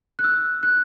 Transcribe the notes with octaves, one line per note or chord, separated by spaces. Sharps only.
F#6
E6
F#6